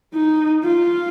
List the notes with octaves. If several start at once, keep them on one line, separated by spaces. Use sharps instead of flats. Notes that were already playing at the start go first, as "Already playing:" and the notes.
D#4
F4